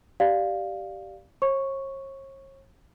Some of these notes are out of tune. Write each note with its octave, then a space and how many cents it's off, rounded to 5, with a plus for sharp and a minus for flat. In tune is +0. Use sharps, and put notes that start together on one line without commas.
G4 -10 D5 +0 F5 +0
C#5 -40 C#6 +0